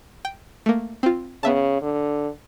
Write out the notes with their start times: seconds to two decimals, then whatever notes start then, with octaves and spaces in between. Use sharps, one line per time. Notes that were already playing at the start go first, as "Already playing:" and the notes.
0.25 G5
0.66 A3 A#3
1.03 C4 F4
1.43 C#3 B3 E5 A5
1.82 D3